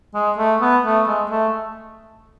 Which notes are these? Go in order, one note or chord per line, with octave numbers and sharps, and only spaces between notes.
G#3
A3
B3
A3
G#3
A3